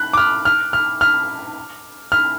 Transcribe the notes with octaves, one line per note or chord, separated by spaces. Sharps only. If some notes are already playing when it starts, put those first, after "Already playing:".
Already playing: F#6
D6
F6
F6
F6
F6
F6